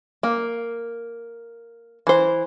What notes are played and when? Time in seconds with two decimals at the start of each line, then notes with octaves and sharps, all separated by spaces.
0.23 A#3
2.07 E3 C5